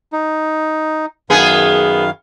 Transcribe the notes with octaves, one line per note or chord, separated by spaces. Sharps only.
D#4
F#2 D#3 B3 G#4 F5